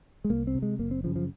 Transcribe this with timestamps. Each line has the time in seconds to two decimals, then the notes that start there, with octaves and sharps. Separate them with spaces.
0.24 G#3
0.30 C2 A#3
0.47 C4
0.55 C3
0.62 G#3
0.79 F#1 A#3
0.91 C4
1.04 F#2 C#3 F3
1.16 F3